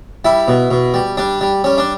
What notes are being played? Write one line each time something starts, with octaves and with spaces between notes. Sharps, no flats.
G3 E4
B2
B2
G3
G3 D4
G3
G3 C#4
D4